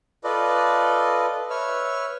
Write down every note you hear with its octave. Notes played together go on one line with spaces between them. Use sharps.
F4 A4 B4 D5 D#5
B4 C#5 E5 E6 F6